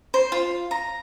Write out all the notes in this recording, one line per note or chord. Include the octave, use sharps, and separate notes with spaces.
C5
F4
A#5